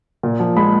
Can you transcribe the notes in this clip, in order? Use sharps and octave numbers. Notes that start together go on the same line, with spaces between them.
A#2
F3
G#3 B5